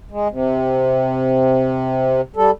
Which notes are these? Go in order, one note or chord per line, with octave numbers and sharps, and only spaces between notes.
G#3
C3
G3 A4